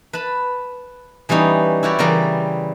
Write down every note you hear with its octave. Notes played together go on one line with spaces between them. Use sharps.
B4 A5 B5
E3 G3 B3 C#4 D#4
E4 F#4 G4 C#5 D5
C#3 E3 G3 A#4 D5 G5